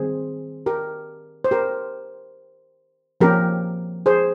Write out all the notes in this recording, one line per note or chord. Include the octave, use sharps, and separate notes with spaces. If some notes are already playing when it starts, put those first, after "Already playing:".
Already playing: D#3 G3 C4 G#4 C5
G4 A#4
C5
G4 A#4
F3 A#3 C#4 G4 A#4
G#4 C5